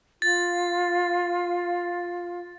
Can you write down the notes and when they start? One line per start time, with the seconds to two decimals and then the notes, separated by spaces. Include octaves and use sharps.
0.22 F4 A6